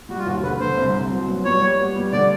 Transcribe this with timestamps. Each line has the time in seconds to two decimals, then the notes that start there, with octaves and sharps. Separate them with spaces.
0.09 G3 F#4
0.18 F4
0.26 D#2 F#4
0.43 D3 B4
0.60 D3 C5
0.77 C2
0.94 C2
1.11 F#3
1.28 B3
1.45 G3 C#5
1.62 G3
1.79 B3
1.96 G3
2.13 D3 D5